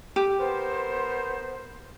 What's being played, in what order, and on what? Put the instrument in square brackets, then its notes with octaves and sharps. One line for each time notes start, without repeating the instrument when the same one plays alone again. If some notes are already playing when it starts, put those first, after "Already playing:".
[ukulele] G4
[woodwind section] B3 A#4 C5